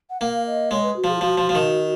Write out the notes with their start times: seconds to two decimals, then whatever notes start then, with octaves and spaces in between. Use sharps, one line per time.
0.10 F#5
0.21 A#3 F5
0.46 D#5
0.71 G#3 C#5
0.83 B4
0.96 F#4
1.04 F3 G#4
1.15 F4
1.21 F3 F#4
1.38 F3
1.49 F3
1.55 D#3